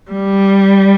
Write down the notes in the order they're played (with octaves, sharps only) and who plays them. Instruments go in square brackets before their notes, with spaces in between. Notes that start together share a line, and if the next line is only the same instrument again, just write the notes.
[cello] G3